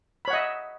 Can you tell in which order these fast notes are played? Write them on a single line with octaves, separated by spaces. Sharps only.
B5 C#5 F#5 D#5 E5